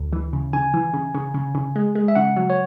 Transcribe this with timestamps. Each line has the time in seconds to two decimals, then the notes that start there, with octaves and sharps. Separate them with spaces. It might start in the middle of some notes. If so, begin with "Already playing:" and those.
Already playing: D2
0.13 E3
0.33 C#3
0.53 C#3 G#5
0.74 E3
0.94 C#3
1.15 C#3
1.34 C#3
1.55 C#3
1.76 G#3
1.95 G#3
2.08 E5
2.15 C#3 F#5
2.37 F#3
2.50 C#5